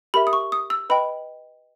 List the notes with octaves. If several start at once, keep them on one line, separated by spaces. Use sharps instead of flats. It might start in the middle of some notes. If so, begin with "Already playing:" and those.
G4 A#4 E5 B5
D#6
C#6
D#6
E6
B4 D#5 G5 B5